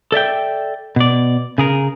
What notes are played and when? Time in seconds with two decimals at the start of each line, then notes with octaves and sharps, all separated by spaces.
0.12 A4 D5 E5 G5
0.96 B2 D5
1.58 C#3 G#4 A#4